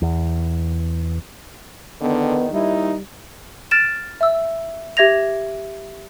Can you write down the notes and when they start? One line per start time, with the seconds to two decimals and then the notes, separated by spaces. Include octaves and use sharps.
0.02 E2
2.01 E2 D3 D#3 B3
2.52 D#2 G3 D#4 E4
3.71 F6 A6 D7 E7
4.21 E5 E6
4.97 G4 E5 G#6 A#6 F7